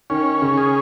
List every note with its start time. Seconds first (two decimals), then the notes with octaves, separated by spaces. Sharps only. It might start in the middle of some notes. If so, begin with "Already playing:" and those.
0.10 D#3 C#4
0.42 C#3
0.58 G#4